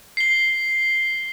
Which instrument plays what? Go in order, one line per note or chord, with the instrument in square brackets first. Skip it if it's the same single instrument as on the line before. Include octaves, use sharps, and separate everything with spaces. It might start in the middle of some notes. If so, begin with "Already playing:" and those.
[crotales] C7 G7